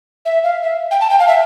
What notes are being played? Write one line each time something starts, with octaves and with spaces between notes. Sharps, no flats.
E5
F5
E5
G5
A5
G5
F5
E5